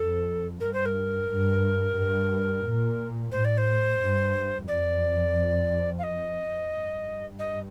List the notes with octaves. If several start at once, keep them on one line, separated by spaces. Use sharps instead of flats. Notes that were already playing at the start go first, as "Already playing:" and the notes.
Already playing: F2 A4
G2 A#4
C5
A#4
G2
G2
A#2
A2 C5
D5
C5
G2
F2 D5
F5
D#5
G2
D#5